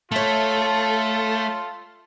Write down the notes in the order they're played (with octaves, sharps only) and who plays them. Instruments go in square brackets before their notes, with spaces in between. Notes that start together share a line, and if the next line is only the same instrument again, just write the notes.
[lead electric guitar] A3 [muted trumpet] F4 [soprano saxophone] A4 [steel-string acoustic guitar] C#5 E5